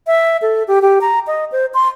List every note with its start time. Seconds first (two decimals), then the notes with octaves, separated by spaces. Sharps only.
0.07 E5
0.42 A4
0.68 G4
0.82 G4
1.01 A#5
1.27 D#5
1.52 C5
1.74 C6